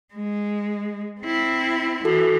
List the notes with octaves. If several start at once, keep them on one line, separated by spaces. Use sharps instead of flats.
G#3
C4 E4
E3 F#4 A4